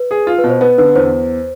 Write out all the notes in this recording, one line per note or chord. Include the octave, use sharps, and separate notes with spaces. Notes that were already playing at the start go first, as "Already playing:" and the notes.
Already playing: B4
G#4
F4
B4
B2
C5
B3 B4
D3 B4
E2 C5